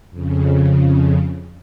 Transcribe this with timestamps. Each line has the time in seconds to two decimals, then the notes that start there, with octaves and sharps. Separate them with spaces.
0.11 F2 C#3